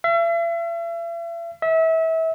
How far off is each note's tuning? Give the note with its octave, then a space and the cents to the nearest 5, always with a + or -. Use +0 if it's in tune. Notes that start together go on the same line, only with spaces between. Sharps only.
E5 +40
E5 -30